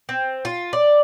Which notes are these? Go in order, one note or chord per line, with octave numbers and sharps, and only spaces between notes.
C4
F4
D5